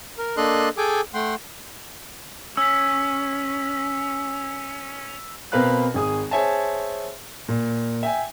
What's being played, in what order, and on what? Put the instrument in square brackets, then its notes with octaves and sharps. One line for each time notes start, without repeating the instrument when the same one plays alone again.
[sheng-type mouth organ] A#4
A#3 D4 A4 D#5 C6 F#6
G#4 A4 G5 G#5 D6
A3 F#5 G5 C6
[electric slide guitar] C#4 [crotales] E6 B6
[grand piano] B2 C4 A#4 B4 F5 F#6
G#1 G#4 D#6
G#4 C5 C#5 E5 G#5 A5
A#2
E5 G5 G#5